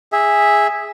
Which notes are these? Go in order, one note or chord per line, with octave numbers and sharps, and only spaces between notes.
G#4 E5